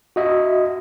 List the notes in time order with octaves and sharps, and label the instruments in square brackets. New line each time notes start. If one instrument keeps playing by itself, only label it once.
[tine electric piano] F#4 D#5 E5